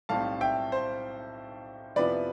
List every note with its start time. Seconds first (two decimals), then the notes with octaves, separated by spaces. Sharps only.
0.09 B1 A2 G3 C4 F5 A5
0.41 E5 G5
0.72 C5
1.96 F2 C3 F3 B3 E4 B4 D5